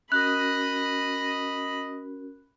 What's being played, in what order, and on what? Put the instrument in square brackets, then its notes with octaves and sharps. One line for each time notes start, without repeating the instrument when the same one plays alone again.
[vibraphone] C#4 F#4 A#4 [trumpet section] D#5 [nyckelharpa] B5 [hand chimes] F#6